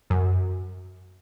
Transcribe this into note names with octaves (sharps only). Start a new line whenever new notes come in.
F#2